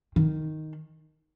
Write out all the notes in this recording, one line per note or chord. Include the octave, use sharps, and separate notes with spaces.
D#3